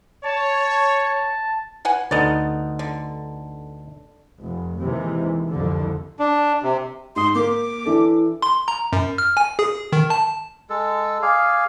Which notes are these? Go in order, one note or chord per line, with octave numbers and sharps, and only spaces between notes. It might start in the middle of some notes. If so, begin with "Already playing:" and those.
C#5 A5
B4 F#5 G#5
D2 B3 D#4 A4 D5
D3
F1
D#2 C3 E3 G#3
C2 F2 D3
D4
C3
G#2 C6 D#6
A#3 A#4 D6
E3 D4 A4
C6
A#5
F#2
F6
G#5
G#4
D#3
A5
G#3 A4
G#4 D5 F5